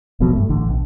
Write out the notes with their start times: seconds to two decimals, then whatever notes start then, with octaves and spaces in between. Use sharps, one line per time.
0.20 D1 A1 B2 F#3
0.33 G2 A3
0.49 A1 D3
0.69 B1